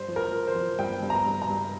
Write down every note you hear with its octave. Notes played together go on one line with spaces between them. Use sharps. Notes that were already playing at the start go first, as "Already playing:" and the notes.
Already playing: G2 C5
F3
A#4
F3
C5
F3
G2 G5
G2
A#5
G2
A#5
G2